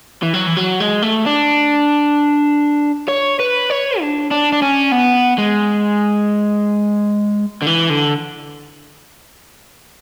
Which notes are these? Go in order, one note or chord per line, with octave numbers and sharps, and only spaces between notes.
E3
F#3
E3
F#3
G#3
A3
D4
C#5
B4
C#5
D4
D4
D4
C#4
B3
G#3
D3
E3
D3